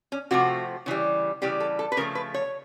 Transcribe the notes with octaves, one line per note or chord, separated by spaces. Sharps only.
C#4
C3 F3 A3 F#4
C#3 E3 G3
C#3 E3 G3 G4
A4
A4
B4
C#3 F3 A3 A#4
B4
C#5